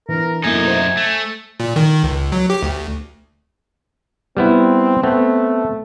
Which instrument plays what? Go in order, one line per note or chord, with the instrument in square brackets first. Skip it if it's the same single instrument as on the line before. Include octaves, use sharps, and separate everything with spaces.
[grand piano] E3 D4 [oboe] A#4
[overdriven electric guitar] F#2 D#4 [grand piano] A3 A#3 E4 [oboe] G#5
[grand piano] C5 E5
[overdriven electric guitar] A3
[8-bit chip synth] A#2
D#3
C#2
F#3
G4
D2
[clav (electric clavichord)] G3 B3 E4 [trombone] C4
[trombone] A3 [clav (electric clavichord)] B3 C4